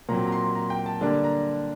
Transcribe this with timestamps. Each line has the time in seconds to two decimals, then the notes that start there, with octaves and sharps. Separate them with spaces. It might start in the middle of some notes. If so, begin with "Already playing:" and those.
0.09 A#2 F#3 C4 A#5
0.27 A#5
0.32 C6
0.55 A#5
0.70 G5
0.86 A5
1.01 D3 G3 A#3 D4 A5
1.24 A#5